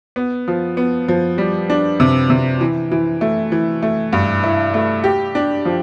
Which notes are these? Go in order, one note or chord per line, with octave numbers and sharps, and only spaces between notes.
B3
F3
B3
F3
G3
D4
C3
C3
E3
E3
A3
E3
A3
G2
E4
A3
G4
D4
F3